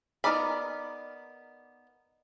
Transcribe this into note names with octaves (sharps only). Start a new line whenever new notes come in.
B3 D#4 A#4 D5 B5